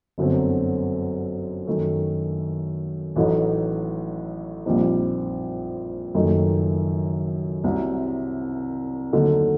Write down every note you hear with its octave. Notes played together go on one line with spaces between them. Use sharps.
G1 F#2 D3 F#3 C4
F#2 D#3 A3
A1 A2 F#3 A3 D#4
A#1 A#2 G3 C4 D#4
F#1 F#2 D#3 A3 D#4
C2 C3 F#3
D#2 D3 F#3 A3 D#4